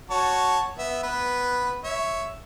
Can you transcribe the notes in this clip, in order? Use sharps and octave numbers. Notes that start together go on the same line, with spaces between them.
F#4 C#5 A5
B3 E5
B3 B4
C#5 E5